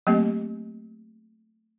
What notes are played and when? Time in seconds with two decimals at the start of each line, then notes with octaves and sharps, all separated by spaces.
0.07 F#3 A3 A#3 C4 G4 D#5